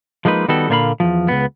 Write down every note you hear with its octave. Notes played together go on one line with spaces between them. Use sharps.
F3 G#3 A#3 D#4 B4
D#3 G3 B3 F#4 A4
A#2 D3 A#3 C#5 F5 B5
E2 G2 F3
C#2 G#2 B3